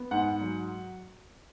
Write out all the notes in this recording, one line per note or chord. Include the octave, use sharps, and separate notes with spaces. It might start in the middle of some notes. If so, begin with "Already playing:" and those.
Already playing: B3
G#2 F#5
F#3